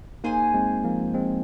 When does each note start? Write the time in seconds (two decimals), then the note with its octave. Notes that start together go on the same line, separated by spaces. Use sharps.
0.24 A#3 D#4 G#4 C5 G#5
0.54 G#3 C4
0.84 F3 A#3
1.14 G#3 C4